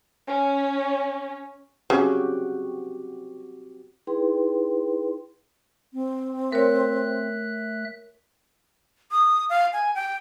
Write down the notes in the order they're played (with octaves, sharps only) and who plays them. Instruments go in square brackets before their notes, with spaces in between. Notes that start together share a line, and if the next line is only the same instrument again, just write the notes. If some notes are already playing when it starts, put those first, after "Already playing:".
[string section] C#4
[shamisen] C#3 [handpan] C4 F#4 G4
[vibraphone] D#4 E4 G#4 B4 G5 C6
[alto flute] C4
[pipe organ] A3 E5 F#6 [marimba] A#4 C#5
[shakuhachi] D#6
F5
G#5
G5